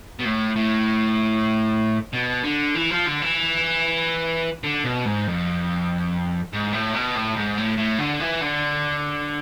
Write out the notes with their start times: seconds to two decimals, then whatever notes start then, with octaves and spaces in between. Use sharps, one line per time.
0.19 B2
0.25 A2
0.56 A2
2.13 B2
2.44 D3
2.75 E3
2.90 F3
3.06 D3
3.22 E3
4.64 D3
4.84 B2
5.06 G#2
5.27 F2
6.53 G#2
6.73 A2
6.94 B2
7.16 A2
7.36 G#2
7.58 A2
7.78 A2
7.99 D3
8.20 E3
8.41 D3